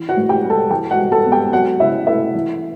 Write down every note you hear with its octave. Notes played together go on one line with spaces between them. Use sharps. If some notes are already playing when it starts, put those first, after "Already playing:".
Already playing: E3
F#4 F#5
A2
G4 G5
G3
A4 A5
E3 G4 G5
F#4 F#5
G2
A4 A5
B3
G4 G5
F#3 F#4 F#5
C#3 E4 E5
A3 E4 E5
E3